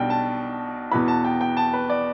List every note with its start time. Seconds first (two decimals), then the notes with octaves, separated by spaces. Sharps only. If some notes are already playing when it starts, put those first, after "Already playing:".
Already playing: B1 B2 G3 D4 G5
0.10 A5
0.91 E2 B2 B3 E4 B5
1.08 A5
1.24 G5
1.41 G5
1.57 A5
1.73 B4
1.90 D5